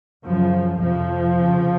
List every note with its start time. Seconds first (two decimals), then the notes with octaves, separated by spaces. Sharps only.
0.26 F#2 C#3 F3
0.79 F2 C3 F3
1.35 F2 C#3